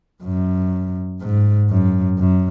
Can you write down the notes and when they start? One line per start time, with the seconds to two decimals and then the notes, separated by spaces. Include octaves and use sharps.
0.24 F#2
1.21 G#2
1.70 F#2
2.19 F#2